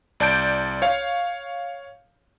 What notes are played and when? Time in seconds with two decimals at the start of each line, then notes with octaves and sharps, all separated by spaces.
0.20 C2 D5 A5 G6 D7
0.82 C#5 F5